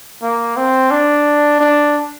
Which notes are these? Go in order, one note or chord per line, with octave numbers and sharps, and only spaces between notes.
A#3
C4
D4
D4